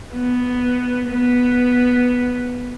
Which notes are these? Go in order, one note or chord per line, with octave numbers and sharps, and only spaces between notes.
B3
B3